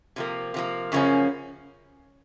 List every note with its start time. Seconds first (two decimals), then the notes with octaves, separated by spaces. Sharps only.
0.16 C3 F3 A#3
0.54 C3 F3 A#3
0.92 F#2 C#3 F3 A#3 C#4